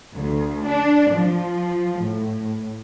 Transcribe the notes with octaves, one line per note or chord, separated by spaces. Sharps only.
D2
D4
F3
A2